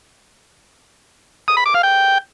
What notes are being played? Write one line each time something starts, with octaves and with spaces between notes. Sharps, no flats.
D#6
B5
D6
F5
G5